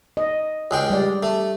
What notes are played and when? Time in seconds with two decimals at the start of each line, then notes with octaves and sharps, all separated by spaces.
0.17 D#5
0.71 C#2 G#3 G5
0.90 G3 D5
1.23 A3